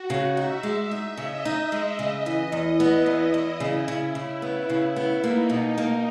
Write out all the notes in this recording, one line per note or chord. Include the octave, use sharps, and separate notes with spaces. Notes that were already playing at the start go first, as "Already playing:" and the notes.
Already playing: F#4
C#3
D#4 E5
G#3
D#4
C#3 D#5
D#4
G#3
C#3
E3
E2
B3 E4
E2
E2
C#3 E4
C#3
C#3
B3
C#3
B3
A#3 D#4
B2
A#3